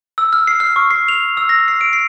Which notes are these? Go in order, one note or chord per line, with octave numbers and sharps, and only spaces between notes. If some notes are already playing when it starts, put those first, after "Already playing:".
E6
F6
C7
F6
C#6
C7
F7
E6
A#6
C7
D7
C7